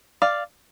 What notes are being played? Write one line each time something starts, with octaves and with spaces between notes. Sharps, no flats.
D5 F5